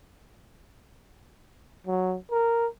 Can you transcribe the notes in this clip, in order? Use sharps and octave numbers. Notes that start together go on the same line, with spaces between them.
F#3
A#4